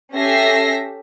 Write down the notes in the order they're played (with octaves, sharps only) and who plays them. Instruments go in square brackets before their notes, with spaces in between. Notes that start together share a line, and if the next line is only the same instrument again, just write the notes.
[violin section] C#4 G4 A4 E5 A#6 C7